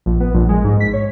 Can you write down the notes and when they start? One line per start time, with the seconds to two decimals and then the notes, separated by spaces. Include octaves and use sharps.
0.06 A#1
0.20 B3
0.34 A#1
0.49 G#3
0.64 G#2
0.80 B6
0.93 C#5